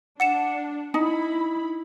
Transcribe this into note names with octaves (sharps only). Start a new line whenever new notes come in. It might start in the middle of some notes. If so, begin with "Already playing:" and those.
D4 F#5 C#7 E7
D#4 E4 B5